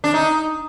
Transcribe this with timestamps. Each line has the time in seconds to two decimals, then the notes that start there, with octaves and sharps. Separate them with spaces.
0.04 D4
0.14 D#4